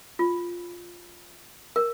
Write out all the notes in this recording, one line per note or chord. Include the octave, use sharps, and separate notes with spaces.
F4
A#4